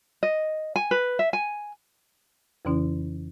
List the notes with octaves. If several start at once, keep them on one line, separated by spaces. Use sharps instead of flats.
D#5
G#5
B4
E5
G#5
F2 C#3 E3 C#4 E4